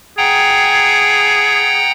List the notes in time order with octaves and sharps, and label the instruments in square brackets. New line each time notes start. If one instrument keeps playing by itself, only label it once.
[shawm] G#4 [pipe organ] F#5 G5 A#5